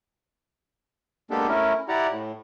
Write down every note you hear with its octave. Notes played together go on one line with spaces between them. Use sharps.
G#3 A#3 B3 D4 G4 A4
A3 C#4 E4 A#4
E4 G4 D5 F#5 A#5
A2